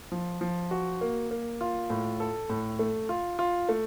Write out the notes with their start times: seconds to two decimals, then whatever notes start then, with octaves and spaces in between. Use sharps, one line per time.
0.12 F3
0.41 F3
0.71 F#4
1.01 A#3
1.31 A#3
1.61 F4
1.90 A2
2.20 A4
2.50 A2
2.79 A3
3.09 F4
3.39 F4
3.69 A3